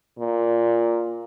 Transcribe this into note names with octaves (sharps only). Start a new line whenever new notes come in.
A#2